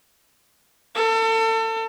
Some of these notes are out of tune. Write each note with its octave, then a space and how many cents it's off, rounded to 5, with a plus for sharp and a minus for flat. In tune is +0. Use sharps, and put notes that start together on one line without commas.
A4 +35